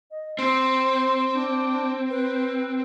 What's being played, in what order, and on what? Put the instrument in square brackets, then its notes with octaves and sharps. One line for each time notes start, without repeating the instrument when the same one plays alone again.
[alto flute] D#5
[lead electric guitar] C4 [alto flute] C6
[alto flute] D4
B4